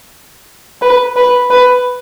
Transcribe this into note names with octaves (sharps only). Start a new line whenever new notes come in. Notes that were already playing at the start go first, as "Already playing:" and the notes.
B4
B4
B4